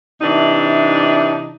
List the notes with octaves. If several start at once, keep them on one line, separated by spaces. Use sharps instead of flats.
C3 E3 D4 D#4